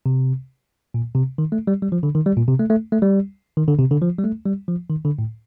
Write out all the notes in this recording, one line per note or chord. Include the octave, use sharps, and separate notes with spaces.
C3
A#2
C3
D#3
A3
G3
G3
F3
D3
D#3
G3
A#2
C3
A3
A3
A3
G3
D#3
D3
C3
D3
F3
G3
A3
G3
F3
D#3
D3
A2